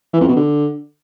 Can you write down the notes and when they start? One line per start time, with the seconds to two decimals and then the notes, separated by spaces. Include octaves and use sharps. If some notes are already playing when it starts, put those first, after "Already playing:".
0.13 E3
0.21 F2
0.29 B2
0.36 D3